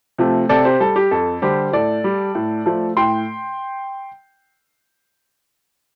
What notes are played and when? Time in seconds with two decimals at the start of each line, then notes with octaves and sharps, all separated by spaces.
0.18 C3 F3 A3
0.49 C3 A4 D5
0.65 G4 C5
0.80 G3 A4
0.96 G4
1.11 F2 A4
1.42 D3 G3 G4 C5
1.73 A2 A4 D5
2.04 G3
2.35 A2
2.66 F3 A3
2.97 A2 G5 C6